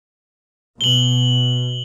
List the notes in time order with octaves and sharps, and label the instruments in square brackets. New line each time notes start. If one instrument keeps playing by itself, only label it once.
[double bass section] B2 [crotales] F#7 G7